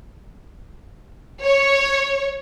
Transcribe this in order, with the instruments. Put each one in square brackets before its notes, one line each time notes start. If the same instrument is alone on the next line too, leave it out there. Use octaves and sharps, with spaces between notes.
[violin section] C#5